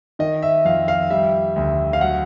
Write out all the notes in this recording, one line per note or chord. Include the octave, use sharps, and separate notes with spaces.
D#3 D#5
E5
F2 F5
F5
G3 E5
D2
F5
F#3 F#5